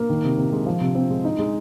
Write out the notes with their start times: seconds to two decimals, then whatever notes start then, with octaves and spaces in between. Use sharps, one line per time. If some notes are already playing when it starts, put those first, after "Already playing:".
Already playing: A#3
0.09 D#3
0.24 C3
0.38 C3
0.52 G#3
0.66 F3
0.81 C3
0.95 C4
1.10 G#3
1.25 D#4
1.39 G#3